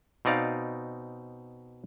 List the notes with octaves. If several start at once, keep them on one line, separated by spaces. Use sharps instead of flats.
B2 C4 D#4 D5 F5